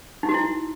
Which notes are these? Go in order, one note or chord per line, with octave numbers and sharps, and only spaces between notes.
D#4
F#4
E4